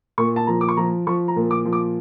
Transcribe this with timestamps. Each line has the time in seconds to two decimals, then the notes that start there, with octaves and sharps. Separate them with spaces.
0.18 A#2 C#6
0.36 A5
0.47 F3 A#5
0.61 D6
0.68 C#6
0.77 F3 A#5
1.07 F3 C#6
1.28 A#5
1.36 A#2
1.51 D6
1.65 F3
1.73 D6